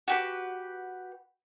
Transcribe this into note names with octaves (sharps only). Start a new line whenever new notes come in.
F#4 G4 B4